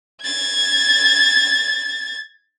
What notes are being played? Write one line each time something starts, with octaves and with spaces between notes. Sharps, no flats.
G#6 A6